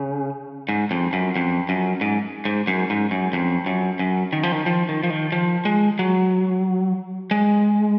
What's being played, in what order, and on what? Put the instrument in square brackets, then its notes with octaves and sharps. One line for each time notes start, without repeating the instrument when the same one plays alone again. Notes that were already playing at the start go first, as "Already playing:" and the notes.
Already playing: [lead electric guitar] C#3
G#2
F2
F#2
F2
F#2
G#2
G#2
F#2
G#2
F#2
F2
F#2
F#2
D#3
F3
D#3
F3
D#3
F3
D#3
F3
G#3
F#3
G#3